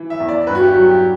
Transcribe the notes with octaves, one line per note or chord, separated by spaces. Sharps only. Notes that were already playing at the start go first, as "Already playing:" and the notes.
Already playing: E3
E5
E2
D5
G2 B4
F#4
G4
F#3 F#4
G4